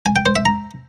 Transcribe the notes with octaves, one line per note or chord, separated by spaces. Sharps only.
G#5
G5
C5
E5
A#5